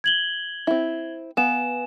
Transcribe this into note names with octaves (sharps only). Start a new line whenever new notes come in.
G#6 F#7 G7
C4 E4
B3 F5 G#5 E7